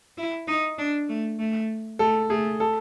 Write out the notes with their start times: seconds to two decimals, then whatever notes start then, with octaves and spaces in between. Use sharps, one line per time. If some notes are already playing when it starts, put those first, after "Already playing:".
0.17 E4
0.48 D#4
0.78 D4
1.09 A3
1.39 A3
1.99 A3 A4
2.30 A3 G#4
2.60 A4